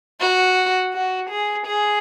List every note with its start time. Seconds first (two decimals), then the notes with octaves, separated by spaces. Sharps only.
0.20 F#4
0.94 F#4
1.30 G#4
1.66 G#4